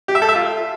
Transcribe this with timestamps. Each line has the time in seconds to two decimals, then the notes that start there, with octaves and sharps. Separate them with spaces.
0.08 G4
0.15 E5
0.22 A4
0.29 E5
0.35 F4